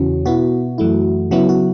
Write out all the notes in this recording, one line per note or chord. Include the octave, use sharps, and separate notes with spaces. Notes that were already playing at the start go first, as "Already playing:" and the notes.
Already playing: E2 C#3 E3 C#4 F#4
B2 B3 E4 F#4
F#2 E3 A3 E4
C#3 F#3 B3 E4 F#4
F#4